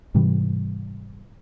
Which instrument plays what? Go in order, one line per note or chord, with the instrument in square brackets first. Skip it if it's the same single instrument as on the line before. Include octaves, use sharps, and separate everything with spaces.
[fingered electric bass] G#2 C3 E3 G3